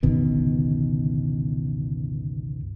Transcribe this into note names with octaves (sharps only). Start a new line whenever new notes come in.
G1 C#2 B2 D#3